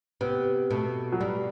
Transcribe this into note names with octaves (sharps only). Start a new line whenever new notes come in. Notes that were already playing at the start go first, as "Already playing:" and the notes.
C3 B3
B2 A3
F#3
B2 G3